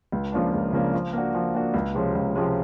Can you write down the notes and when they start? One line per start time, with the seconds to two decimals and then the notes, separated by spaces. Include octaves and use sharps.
0.12 C#2
0.32 C#3 F3 A#3 D4
0.53 C#2
0.73 C#3 F3 A#3 D4
0.94 F3
1.13 A#3 D4 F#4
1.34 F3
1.54 A#3 D4 F#4
1.74 C#2
1.94 C3 F3 G#3 C#4
2.15 C#2
2.35 C3 F3 G#3 C#4